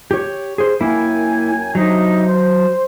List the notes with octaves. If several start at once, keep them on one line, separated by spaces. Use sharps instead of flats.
G4 C#5
G#4 C5
F#2 A#3 E4 G5 G#5
C3 F#3 D4 D#4
C5